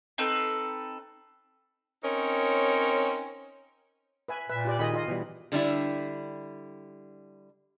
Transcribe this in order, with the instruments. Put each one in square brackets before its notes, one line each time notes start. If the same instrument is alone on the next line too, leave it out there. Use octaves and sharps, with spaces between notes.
[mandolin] C4 D#4 A4 B4
[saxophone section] C4 C#4 D#4 A#4 C#5
[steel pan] B4 E5 G#5
[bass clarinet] A#2 [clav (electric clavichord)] B4 [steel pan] E5
[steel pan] F4 G4 D5
[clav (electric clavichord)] D#3 G#4 [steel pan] F4 D#5 B5
[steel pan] F4 D#5
[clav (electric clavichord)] B2 E3 G3
[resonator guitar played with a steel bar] D3 G3 D4 E4